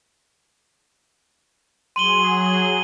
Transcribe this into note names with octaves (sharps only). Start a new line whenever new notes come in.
F#3 G#4 C6 D#7 F#7 G7